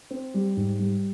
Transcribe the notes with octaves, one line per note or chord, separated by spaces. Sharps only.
C4
G3
G#2
G3